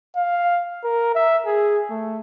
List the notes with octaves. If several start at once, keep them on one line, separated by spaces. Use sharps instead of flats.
F5
A#4
E5
G#4
A3